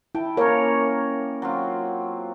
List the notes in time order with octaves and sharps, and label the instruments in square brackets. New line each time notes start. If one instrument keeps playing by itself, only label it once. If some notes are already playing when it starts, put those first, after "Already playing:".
[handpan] E4 [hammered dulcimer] G5 A5
[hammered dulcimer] A#3 C#4 [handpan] A#4 C#5
[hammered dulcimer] F#3 C4 F4